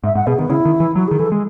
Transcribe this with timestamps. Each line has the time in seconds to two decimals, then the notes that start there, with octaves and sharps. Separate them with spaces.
0.04 G#2 E5
0.15 G#2 F#5
0.27 B2 G#4
0.38 D#3 B3
0.50 C#3 E4
0.65 D#3
0.80 E3
0.96 F#3 F#4
1.08 D#3 G#4
1.19 E3 A4
1.32 G#3